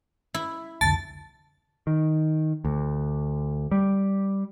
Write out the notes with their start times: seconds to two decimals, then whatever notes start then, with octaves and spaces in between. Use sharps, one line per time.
0.34 E4
0.81 C2 F2 D3 A5 A6
1.87 D#3
2.65 D2
3.71 G3